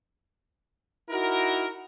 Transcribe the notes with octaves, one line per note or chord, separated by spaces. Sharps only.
D#4 E4 F#4 A#4